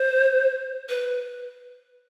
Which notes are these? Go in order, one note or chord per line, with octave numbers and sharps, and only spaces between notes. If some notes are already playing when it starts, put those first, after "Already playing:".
Already playing: C5
B4